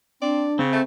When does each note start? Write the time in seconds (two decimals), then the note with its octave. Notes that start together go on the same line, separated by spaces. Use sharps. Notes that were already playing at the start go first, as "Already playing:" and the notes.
0.22 C4 D4 D5
0.59 C#3 C4
0.73 A3